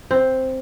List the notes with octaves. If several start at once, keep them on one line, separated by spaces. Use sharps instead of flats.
C4